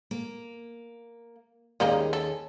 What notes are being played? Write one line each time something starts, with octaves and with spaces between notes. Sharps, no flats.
A#3
D#2 G3 A#3 C#4 D#4 G#4
A4